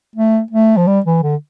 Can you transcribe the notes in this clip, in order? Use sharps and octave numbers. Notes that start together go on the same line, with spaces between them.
A3
A3
F3
G3
E3
D3